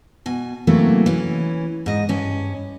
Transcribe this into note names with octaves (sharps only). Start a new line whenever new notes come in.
B2 G#5
C3 E3 F#3 A3 A#3
E3 C#4
G#2 D#5
G2 C#4